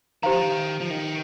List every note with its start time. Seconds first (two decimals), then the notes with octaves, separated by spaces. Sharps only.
0.23 D#3 G4 C5 F5 A#5
0.32 F3
0.41 D#3
0.81 F3
0.90 D#3